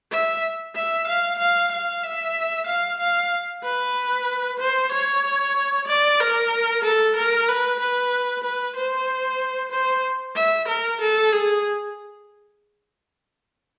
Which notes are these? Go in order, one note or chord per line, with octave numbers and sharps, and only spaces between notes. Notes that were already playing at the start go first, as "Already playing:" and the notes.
E5
E5
F5
F5
F5
E5
F5
F5
B4
C5
C#5
D5
A#4
A4
A#4
B4
B4
B4
C5
C5
E5
A#4
A4
G#4